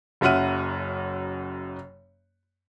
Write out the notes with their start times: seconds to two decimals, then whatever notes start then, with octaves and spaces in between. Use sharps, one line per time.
0.21 F#1 F#2 E5 F#5 F6 D#7